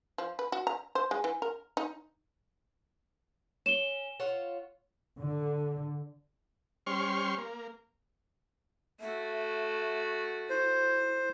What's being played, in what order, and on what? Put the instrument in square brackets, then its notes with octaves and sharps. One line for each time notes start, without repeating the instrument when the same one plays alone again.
[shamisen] F3
B4
F#4
A#5
C5
G#3
E3
A#4
D#4
[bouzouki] C#4 [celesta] E7 G7
[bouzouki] F4 C#5 F#5
[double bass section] D3
[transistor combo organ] G3 C#4 C5 C6 C#6 F6
A#3
[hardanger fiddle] A3 F#4 [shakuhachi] E5
[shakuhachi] E4 [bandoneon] C5